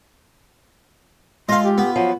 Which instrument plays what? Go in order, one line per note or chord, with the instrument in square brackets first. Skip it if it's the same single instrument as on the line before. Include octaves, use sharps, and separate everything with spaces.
[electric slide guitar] G#3 [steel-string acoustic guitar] F4 A4 [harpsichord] D#5 F5 [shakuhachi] C6
[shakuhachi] G4
[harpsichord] B3
[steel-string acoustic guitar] F3 F#3 [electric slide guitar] F5 [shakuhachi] F#5